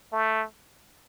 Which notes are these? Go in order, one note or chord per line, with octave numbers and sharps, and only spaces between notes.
A3